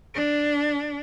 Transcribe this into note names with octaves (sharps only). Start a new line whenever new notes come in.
D4